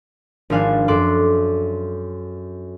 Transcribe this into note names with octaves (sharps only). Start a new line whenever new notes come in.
G#1 F3 D4 F5 G#5 F#6
F#2 A4 C6 D6 F#6